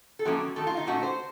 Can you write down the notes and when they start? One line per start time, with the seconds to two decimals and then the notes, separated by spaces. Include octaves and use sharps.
0.19 A4
0.25 A2 F3 A#3 C#4 F#4
0.56 D#3 A3 C4 A4
0.67 F4
0.77 D#4
0.87 A#2 A3 C#4 F#4
1.03 C5